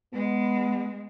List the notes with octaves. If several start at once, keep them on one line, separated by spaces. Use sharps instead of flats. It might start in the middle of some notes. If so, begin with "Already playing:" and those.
G#3 B3